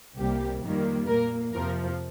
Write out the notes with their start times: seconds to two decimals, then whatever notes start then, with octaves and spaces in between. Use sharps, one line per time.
0.18 C2 C3 G3 A#3 G4
0.63 F2 D#3 G3 A#3
1.07 A#2 A#3 A#4
1.52 F2 C3 F3 A#4